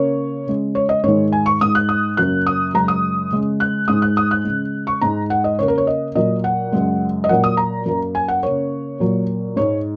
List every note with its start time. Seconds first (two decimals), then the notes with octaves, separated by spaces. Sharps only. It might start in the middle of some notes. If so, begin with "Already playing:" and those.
Already playing: C#3 A#3 C#5
0.47 C#3 G#3
0.75 C#5
0.89 D#5
1.04 G#2 D#3 G#3 C#5
1.32 G#5
1.46 C#6
1.61 G#2 G#3 D#6
1.75 F#6
1.89 D#6
2.17 F#2 C#3 F#3 A#3 F#6
2.47 D#6
2.74 F#2 C#3 G#3 A#5
2.88 D#6
3.31 C#3 G#3
3.60 F#6
3.88 G#2 G#3 D#6
4.02 F#6
4.17 D#6
4.31 F#6
4.45 C#3 G#3
4.87 C#6
5.01 G#2 G#3 A#5
5.30 F#5
5.44 D#5
5.59 C#3 A#3 C#5
5.68 A#4
5.78 C#5
5.87 D#5
6.15 A#2 F#3 A#3 D#5
6.44 F#5
6.72 F#2 C#3 G#3
7.24 D#5
7.29 A#2 F#3 A#3 F#5
7.44 D#6
7.57 A#5
7.86 F#2 F#3 A#3
8.15 G#5
8.28 F#5
8.43 C#3 A#3 C#5
9.00 A#2 F#3 A#3
9.56 G#2 G#3 C#5